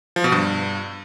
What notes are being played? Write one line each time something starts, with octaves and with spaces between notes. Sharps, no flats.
F3
B2
G2